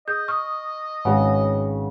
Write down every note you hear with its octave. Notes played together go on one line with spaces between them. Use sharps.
G#4 D#5 D#6 G6
C#6 D#6 F6
G#1 C#3 B3 F#4